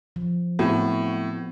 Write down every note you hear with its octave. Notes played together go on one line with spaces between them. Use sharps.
F3
A2 B3 C4 F#4